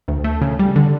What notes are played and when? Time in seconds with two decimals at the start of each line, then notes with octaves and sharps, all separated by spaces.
0.08 D2
0.24 A3
0.42 C#3
0.59 G3
0.76 D3